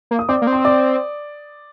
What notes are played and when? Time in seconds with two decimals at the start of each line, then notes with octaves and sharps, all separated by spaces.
0.11 A#3
0.19 D#6
0.29 C4 D5 D6
0.42 A#3
0.47 C4
0.53 C6
0.65 D5 D6